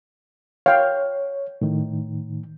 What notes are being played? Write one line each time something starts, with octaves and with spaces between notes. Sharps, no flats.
C#5 F5 G5
A2 D#3